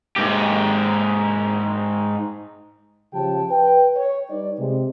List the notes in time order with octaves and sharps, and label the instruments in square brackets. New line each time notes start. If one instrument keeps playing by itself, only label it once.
[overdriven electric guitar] G#2 G4
[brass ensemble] C#3 F3 G4 G5 A5
B4 G5
C#5
G3 D#4 B4 D5
C3 G#3